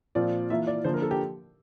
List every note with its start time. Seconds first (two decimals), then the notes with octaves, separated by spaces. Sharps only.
0.15 A#2 F3 C4 F4 D5
0.50 E3 A#3 F4 E5
0.67 D5
0.84 D3 F3 A#3 C5
0.94 A#4
1.02 A4
1.11 G4